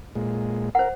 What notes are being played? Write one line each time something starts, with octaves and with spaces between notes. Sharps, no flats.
A#2 G#3
A#4 C5 F#5